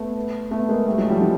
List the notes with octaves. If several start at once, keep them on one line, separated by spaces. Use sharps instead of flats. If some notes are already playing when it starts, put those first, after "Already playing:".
Already playing: A3 B3
A3 B3
G#3 A#3
G3 A3
F#3 G#3
F3 G3
E3 F#3